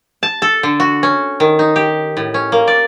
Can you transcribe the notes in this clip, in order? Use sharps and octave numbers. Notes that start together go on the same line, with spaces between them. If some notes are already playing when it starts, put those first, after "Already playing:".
A5
A4
D3
F#4
C#4
D#3
D#4
G4
A2
C#4
A#3
D5